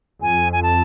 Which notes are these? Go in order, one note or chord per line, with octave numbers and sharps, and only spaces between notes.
F2 G#5
G#5
A5